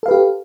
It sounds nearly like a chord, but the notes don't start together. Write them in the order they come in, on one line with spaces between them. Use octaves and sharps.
A4 F5 B4 G4